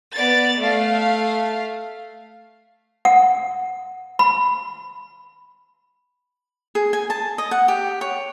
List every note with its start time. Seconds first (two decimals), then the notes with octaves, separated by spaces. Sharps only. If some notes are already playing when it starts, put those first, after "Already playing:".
0.14 B3 D5 A6
0.60 A3 F5
3.05 F#5
4.19 B5
6.75 G#4
6.93 G#5
7.10 A5
7.38 D#5
7.51 F#5
7.68 G4
8.01 C#5